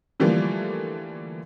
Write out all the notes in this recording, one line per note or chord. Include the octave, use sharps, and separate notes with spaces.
D3 E3 F3 G3 A3 A#3